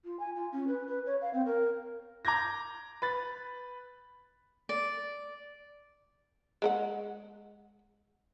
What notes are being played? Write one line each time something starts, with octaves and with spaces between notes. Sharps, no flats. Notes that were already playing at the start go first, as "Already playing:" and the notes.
F4
G#5
F4
C#4
B4
B4
C#5
F5
C4
A#4
A#5 D6 G6 G#6 A#6
B4 B5 A6
D5
G#3 A4 F#5